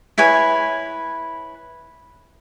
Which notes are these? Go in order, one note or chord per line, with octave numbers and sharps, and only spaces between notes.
E4 B4 C#5 G#5